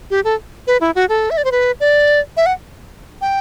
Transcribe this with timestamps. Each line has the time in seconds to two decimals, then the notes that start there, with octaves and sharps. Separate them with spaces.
0.11 G4
0.24 A4
0.67 B4
0.81 E4
0.96 F#4
1.09 A4
1.30 E5
1.37 D5
1.45 C5
1.52 B4
1.80 D5
2.37 E5
2.46 F#5
3.21 G5